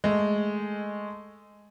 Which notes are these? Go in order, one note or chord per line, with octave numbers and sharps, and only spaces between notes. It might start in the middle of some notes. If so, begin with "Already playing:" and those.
G#3 A3